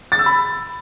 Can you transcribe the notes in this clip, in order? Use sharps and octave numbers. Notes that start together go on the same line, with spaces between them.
A6
E6
B5